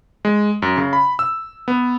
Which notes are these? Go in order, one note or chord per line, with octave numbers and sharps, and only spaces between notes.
G#3
F#2
C#3
B5
E6
B3